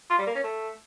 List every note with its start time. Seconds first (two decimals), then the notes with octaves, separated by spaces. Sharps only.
0.10 F4
0.18 G3
0.27 A#3
0.35 C#4
0.44 A3